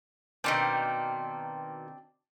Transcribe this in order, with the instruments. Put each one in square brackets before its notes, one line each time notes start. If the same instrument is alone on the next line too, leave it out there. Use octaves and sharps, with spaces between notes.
[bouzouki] B2 D#3 A#3 [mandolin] C4 D4 C5